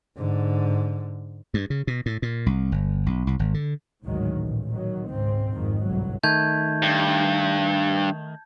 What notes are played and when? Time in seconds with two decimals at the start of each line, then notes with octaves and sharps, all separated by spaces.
0.17 G#2 D3
1.54 G2
1.70 C#3
1.87 B2
2.06 A2
2.22 A#2
2.46 C2
2.72 G1
3.06 B1
3.27 C2
3.39 G#1
3.54 D3
4.04 G#1 D2 A2 D#3 F#3 G#3
4.38 A1 A#2
4.72 D#3 F#3
5.09 C#2 G#2 C4
5.54 G#1 F2 G#2 D#3
5.86 G1 C2 F#3
6.23 D#3 A3 A5 G6 G#6
6.82 G2